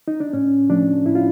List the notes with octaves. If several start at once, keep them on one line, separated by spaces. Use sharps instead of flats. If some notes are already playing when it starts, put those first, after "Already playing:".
D#4
D4
A2 C#4
F3 A3 D4
A2 E4
F4